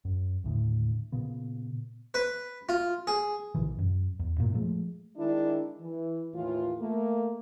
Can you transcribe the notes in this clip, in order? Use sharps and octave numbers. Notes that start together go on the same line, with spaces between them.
F#2
D#2 A2 D3
A#2 C#3 B3
B4
F4
G#4
A#1 C3 D#3 E3
F#2
E2
G2 A#2 A#3
F3 G#3 A3
D#3 G#3 D4 E4
E3
D#2 A2 E3 F4
A3 A#3